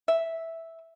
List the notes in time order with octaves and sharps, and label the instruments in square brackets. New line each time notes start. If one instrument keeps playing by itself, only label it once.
[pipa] E5